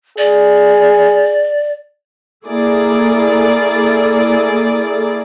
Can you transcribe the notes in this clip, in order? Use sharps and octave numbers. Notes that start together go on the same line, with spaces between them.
G#4 D5
A#3 E4 G#4 A4 D5